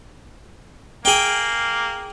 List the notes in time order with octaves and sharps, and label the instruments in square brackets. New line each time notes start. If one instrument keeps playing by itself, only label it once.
[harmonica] A#3 [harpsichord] G#4 G5